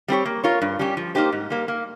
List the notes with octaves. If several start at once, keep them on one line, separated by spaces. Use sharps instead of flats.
G3 C4 G4 C#5
A#3
F4 A#4 C#5
G2
G3 C#4 G4
F3
A#3 D#4 G4 C5
G#2
G3 A#3
A#3